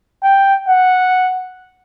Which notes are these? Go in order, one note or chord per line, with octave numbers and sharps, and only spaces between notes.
G5
F#5